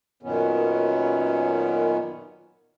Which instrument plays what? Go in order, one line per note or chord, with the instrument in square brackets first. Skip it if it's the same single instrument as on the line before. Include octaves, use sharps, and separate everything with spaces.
[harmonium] F#2 A#2 D#3 B3 C#4